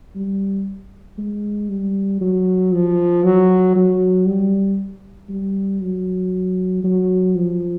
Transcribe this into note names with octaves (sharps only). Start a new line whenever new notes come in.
G3
G#3
G3
F#3
F3
F#3
F#3
G3
G3
F#3
F#3
F3